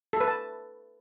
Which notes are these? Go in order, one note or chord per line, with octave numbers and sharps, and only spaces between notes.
A4
B4
A5